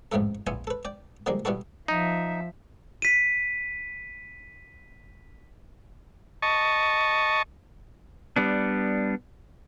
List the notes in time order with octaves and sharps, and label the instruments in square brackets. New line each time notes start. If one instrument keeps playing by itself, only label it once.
[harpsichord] A1 F2 G#2 E3 A3 A4
A#1 B3 E4 F4 G#5
A4 B4
D5 G5
D3 F3 G3 G#3 A#3
B2 E3 G3 E4 F#4 A4
[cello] F3 E5 [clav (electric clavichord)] D#4
[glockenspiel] B6 D#7
[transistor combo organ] D#5 A5 C#6
[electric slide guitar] G3 B3 D4